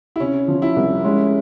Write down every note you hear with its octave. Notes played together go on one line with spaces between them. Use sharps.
E4
C3 C#4
F3
E4
C2
G#3 C#4